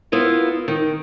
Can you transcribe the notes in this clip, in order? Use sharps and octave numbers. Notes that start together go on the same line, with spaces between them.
B3 E4 F4 A#4
D#3